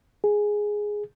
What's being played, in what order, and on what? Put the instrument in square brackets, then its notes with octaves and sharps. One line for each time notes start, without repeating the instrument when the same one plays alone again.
[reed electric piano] G#4